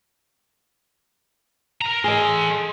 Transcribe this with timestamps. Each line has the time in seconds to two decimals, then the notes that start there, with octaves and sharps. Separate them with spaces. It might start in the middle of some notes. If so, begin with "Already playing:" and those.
1.81 A#4 A#5
2.04 G#4 A4 D#5 C6